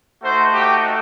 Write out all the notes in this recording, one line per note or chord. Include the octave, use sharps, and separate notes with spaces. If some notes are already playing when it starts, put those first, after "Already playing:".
A3 D#4 F#4 C5
G4